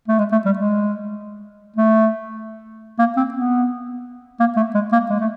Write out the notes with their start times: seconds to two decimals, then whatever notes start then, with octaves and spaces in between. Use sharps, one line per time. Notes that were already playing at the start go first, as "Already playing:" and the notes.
0.08 A3
0.19 G#3
0.32 A3
0.46 G3
0.59 G#3
1.76 A3
2.99 A#3
3.17 C4
3.34 B3
4.40 A#3
4.57 A3
4.75 G#3
4.93 A#3
5.10 G#3
5.20 A3